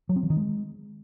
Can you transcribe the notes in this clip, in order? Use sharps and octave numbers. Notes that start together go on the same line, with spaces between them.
F#3
C4
E3
D#3
G#3